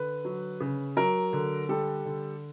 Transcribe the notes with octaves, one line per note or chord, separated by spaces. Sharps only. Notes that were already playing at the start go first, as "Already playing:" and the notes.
Already playing: D3 B4
F#3
C#3
F#3 A#4
D3
G3 A4
D3